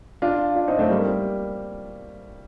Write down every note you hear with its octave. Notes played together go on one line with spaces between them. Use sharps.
D4 F4
D4 F4
C4 D#4
A3 C4
G3 A#3